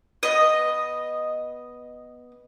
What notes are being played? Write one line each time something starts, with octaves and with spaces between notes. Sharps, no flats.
B3 D#5